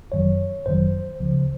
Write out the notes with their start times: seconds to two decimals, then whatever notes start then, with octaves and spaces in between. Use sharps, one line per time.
0.12 G1 F#2 D#3 F#3 C#5
0.66 G1 F#2 D#3 F#3 C5
1.20 C#2 C#3 F3